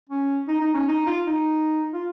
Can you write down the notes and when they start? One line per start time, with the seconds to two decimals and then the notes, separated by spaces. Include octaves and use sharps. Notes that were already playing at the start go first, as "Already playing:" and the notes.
0.10 C#4
0.48 D#4
0.61 D#4
0.75 C#4
0.88 D#4
1.07 F4
1.27 D#4
1.93 F4